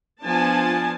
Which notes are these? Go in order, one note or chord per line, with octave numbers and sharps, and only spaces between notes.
F3 B3 D4 G#5 A5